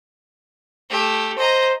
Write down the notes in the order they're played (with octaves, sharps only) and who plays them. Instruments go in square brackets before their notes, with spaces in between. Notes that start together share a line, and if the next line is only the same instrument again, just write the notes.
[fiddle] A3 G4
[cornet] C5 [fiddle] D#5 A#5